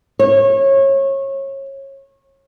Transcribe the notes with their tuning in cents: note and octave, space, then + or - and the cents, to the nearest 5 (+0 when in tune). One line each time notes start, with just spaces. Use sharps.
C#5 -25